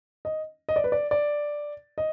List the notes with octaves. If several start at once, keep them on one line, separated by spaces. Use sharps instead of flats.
D#5
D#5
D5
B4
D5
D5
D#5